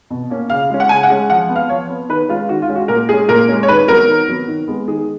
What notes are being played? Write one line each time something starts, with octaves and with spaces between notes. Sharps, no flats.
B2
A#3 C#4
C#3 F5
G#3 C#4
F#5
C#3 G#5
F#5
G#3 C#4
F3 F#5
B3
F5
F3 C#5
B3
D#3 B4
G#3 C#4 F4
D#3 F#4
F4
G#3 C#4
F#4
A#2 A#4
G#3 C#4 G#4
A#2 A#4
G#3 C#4
C#5
D#3 B4
F#3 B3 A#4
D#3
F#3 B3
D#3
G#3 B3
D#3 G#4